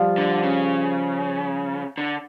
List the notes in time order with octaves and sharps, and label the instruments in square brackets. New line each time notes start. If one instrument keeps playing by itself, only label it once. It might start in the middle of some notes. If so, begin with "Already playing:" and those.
Already playing: [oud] F3 G3
[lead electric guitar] D3
C#3
D3